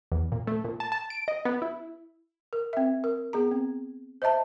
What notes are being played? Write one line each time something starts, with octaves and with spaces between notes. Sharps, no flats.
E2
A#2
A3
A#2
A5
A5
D7
D#5
B3
E4
A#4
C4 E5
A#4
B3 G#4 A#5
C4
C5 D#5 E5 A5 A#5